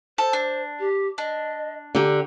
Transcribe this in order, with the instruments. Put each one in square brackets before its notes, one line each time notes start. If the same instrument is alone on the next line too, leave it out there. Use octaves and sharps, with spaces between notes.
[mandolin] A4 [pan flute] C5
[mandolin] D4
[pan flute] G4
[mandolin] D4 [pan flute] D#5
[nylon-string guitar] D3 G4 [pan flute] A#5